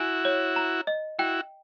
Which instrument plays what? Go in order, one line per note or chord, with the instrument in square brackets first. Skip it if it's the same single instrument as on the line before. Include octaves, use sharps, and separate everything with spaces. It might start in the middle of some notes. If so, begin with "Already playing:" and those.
Already playing: [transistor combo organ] E4 F#4 [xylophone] G#5
[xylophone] C#5
A#5
D#5
[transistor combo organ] E4 F#4 [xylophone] G5